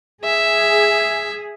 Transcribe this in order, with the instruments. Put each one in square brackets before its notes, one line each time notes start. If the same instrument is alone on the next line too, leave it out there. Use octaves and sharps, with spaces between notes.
[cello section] G#4 [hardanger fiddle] E5